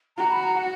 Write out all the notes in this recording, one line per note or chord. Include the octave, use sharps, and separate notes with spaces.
F#4 A#5
B5
A#5
F#5